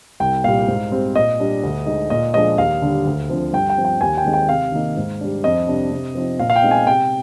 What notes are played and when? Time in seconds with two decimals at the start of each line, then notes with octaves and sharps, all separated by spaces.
0.20 C2 G5
0.44 A#2 G3 F5
0.68 G#2
0.91 G3 C4
1.15 A#2 D#5
1.39 G3 D4
1.63 D2
1.86 D3 G#3 D#4
2.10 A#2 D#5
2.34 F3 G#3 D4 D#5
2.58 D#2 F5
2.82 D3 G3 D4
3.06 D2
3.29 D3 F3 C4
3.53 G2 G5
3.70 G5
3.77 F3 C4
3.85 G5
4.01 D#2 G#5
4.18 G5
4.25 D#3 G#3 C4 D#4
4.33 G5
4.49 C3 F5
4.72 D#3 A#3 D#4
4.97 G#2
5.21 G3 D4
5.44 F2 D#5
5.67 C3 G3 D4
5.92 C3
6.15 F3 C4 D#4
6.39 A#2 F5
6.50 F5
6.56 G5
6.63 G#3 C4 D#4
6.71 G#5
6.87 C3 G5